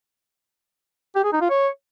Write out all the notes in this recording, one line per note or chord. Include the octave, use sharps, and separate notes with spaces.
G4
G#4
D#4
F4
C#5